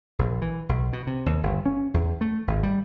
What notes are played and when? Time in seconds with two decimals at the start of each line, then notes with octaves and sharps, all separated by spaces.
0.19 A#1
0.42 E3
0.69 B1
0.93 B2
1.07 C3
1.26 D#2
1.43 G1
1.66 C#4
1.94 E2
2.21 A3
2.47 G#1
2.63 G3